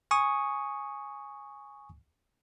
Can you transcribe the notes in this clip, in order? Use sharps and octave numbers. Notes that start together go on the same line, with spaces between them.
G#5 C#6 D#6